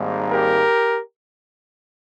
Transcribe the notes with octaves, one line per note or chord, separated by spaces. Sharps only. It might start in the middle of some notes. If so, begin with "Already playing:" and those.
Already playing: G#1 G#2 G3 A#3
G4 A#4